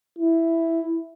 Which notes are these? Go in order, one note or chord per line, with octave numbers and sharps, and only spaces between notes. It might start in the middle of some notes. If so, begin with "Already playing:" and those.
E4